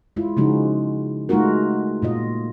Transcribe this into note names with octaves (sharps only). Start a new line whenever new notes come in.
G#3 E4 F4
C#3 F3 G#3 D#4 F#4
G#3 A3 D#4 F4 F#4 A#4
A#2 F4 D#5